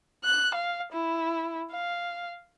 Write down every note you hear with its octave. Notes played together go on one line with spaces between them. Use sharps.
F#6
F5
E4
F5